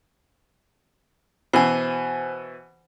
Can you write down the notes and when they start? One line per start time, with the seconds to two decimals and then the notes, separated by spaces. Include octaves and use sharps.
1.53 B2 E3 C5 G#5